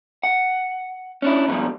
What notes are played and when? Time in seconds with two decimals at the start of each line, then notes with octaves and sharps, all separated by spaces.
0.23 F#5
1.22 C#4 D4 E4
1.48 F2 G#2 B2 D3 G3